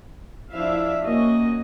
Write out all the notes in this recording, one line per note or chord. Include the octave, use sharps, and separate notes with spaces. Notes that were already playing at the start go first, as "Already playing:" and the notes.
F3 D4 E4 E5 F5
A#3 C#4 F#4 D#5